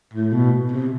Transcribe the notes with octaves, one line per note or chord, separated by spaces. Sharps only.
A2
B2
C3